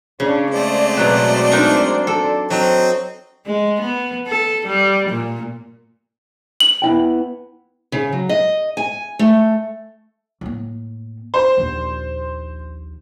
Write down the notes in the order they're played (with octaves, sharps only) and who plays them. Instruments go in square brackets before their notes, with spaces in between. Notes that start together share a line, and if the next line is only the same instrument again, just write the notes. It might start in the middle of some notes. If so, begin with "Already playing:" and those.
[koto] C#3 [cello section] C#4 D4 C#5
[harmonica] G#3 A3 G#4 [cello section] C4 C5 D5
[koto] B2 F#3 F#4
D4 D#4 A#4
A4
[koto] F#3 [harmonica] C4 D#5
[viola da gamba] G#3
B3
A4
G3
A#2
[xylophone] F#7
[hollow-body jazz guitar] B3 E4 G5
[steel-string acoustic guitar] C#3
F#3
D#5
G#5
A3
[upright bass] A2 A#3
[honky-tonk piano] C5
[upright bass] A#1 D#2